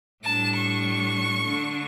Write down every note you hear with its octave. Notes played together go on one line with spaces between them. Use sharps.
A2 G3 D4 A5
C#6
D3 A3 D4